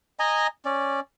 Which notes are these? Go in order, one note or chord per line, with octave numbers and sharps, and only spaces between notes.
D#5 G#5 A#5
C#4 D5